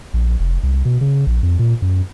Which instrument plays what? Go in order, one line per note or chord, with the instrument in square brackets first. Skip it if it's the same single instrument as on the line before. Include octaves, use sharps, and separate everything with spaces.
[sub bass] A#1
F1
C2
B2
C#3
A#1
F2
A#2
F#2